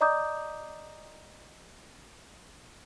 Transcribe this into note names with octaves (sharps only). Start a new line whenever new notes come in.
D5 D#5 A#5 D6 D#6 G6